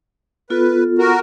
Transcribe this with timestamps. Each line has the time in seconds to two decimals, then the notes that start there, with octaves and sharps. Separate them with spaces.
0.50 B3 F4 A4 B4
0.98 F#4 A#4